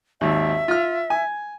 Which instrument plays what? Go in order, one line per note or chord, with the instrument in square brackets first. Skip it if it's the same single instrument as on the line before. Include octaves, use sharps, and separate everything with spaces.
[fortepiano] G#1 D#2 [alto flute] E5
[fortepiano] F4 F6
G#5